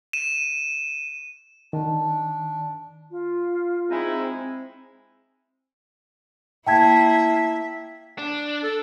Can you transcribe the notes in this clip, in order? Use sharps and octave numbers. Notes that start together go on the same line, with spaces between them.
D#7 E7
D#3 D4
F4
G#3 C4 D#4 E4
A#3 E4 E5 G5 A5 G#6
D4
A4